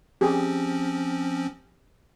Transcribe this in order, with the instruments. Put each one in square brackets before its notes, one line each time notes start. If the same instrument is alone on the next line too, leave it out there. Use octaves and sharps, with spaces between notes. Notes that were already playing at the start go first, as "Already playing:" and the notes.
[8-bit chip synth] F3 C4 C#4 [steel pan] G4 G#4